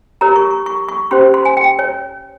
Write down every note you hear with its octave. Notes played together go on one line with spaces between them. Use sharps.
G4 A#4 C#5 A#5
C#6
C#6
C#6
C#6
C#4 G4 C5 C6
C6
G#5
G5
C#5